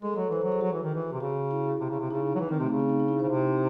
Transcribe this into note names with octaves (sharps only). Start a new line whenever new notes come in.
G#3 A4
F#3 A4
E3 C5
F#3 A4
G#4
F#3 F#4
E3
D#3
E3
C3
C#3 F#4
E4
C3
C#3
C3
C#3 D#4
F#3
E3 D#4
D#3 C4
C3 A3
C#3 C4
D#4
D#4
D#4
E4
C#3 C5
C3